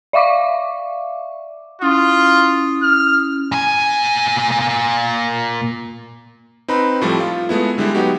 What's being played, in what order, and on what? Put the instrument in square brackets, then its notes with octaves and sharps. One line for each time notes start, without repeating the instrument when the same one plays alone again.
[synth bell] D5 E5 F5 C#6 D6
[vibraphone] C#4 E4 D#6 [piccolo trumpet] F4
[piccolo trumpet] F6
[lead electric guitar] A#2 G#5
[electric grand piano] C4 D#4 B4 A#5 B5
A2 F3 G3 A3 C4
F4
G#3 A3 B3 E4
D3 G3 G#3 E4
F#3 B3 D#4 F#4 G4